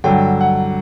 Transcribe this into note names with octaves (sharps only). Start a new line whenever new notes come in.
G2 D3 F#3 G5
F#5